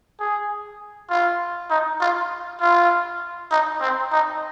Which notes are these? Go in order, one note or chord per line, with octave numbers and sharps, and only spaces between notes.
G#4
F4
D#4
F4
F4
D#4
C4
D#4